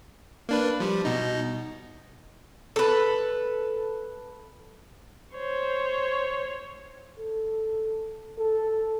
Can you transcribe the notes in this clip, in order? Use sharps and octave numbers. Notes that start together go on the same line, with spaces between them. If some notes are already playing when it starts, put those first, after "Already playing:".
A#3 D4 B4
F3 G3
B2 D#4
A4 B4
C5 C#5
A4
A4